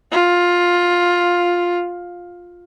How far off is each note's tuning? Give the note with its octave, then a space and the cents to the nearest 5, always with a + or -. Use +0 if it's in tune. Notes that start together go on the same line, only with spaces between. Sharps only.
F4 +10